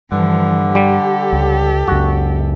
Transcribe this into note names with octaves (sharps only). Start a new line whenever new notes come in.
G2 D3 E3 F3
G3 G4 A4
C#2
C#2 F#2 F#4